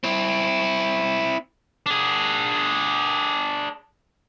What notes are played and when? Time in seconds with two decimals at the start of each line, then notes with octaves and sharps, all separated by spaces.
0.04 C4 E4
1.86 D4 G#4